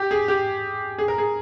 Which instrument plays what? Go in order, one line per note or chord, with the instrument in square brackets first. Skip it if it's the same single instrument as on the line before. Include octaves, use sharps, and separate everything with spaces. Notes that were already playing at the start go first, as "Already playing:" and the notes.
Already playing: [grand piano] G4
G#4
G4
G#4
A#4
G#4